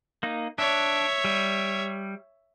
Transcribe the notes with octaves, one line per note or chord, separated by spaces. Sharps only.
A#3 D#4
D4 C#5 E5
G3